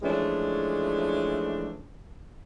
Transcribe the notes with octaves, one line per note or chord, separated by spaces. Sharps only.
E3 F3 G#3 A3 C#4 D4